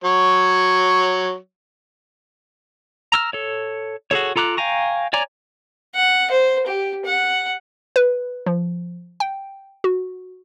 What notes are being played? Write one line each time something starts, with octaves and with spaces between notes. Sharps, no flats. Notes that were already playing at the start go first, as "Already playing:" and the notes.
F#3 C#5
A#5 E6 F6
A4 C#5
F#4 G#4 A4 C#5
F4 A4 A#5 D6 F#6
F5 G5 G#5 A#5 C#6
C#5 D5 G#5 A#5 D6
F#5
C5
G4
F#5
B4
F3
G5
F#4